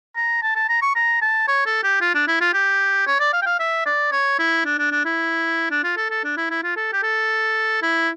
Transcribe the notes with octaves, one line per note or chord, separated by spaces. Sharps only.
A#5
A5
A5
A#5
C#6
A#5
A5
C#5
A4
G4
F4
D4
E4
F4
G4
C#5
D5
F5
G5
F5
E5
D5
C#5
E4
D4
D4
D4
E4
D4
F4
A4
A4
D4
E4
E4
F4
A4
G4
A4
E4